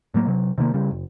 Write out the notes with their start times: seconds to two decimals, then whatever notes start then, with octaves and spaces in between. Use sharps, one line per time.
0.14 A2 F#3 A#3
0.27 C3 F#3
0.58 C3 D#3 A3 A#3
0.74 C#3 G3
0.91 F#1